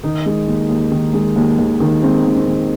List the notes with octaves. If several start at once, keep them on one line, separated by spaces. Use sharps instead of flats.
D#3 D#4
G#3
D#2
D#2
D#3
G#3
D#2
D#2
D#3
G#3 C4
D#2
C4
D#2